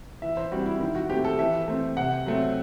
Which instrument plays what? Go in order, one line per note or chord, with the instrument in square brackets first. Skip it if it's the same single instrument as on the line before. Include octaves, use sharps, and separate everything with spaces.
[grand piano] E3 E5
C5
G3 C4 F#4
E4
D#3 E4
F#4
A3 C4 G4
A4
E3 E5
A3 C4
C3 F#5
F#3 A3 C4